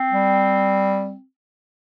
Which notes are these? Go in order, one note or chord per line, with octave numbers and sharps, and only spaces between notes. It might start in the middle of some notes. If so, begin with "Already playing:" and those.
Already playing: C4
G3